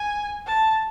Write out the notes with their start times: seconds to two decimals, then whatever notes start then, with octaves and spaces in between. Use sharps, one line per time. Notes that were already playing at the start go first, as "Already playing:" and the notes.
Already playing: G#5
0.46 A5